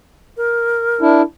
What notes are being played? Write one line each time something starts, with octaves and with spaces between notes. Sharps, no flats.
A#4
D4 E4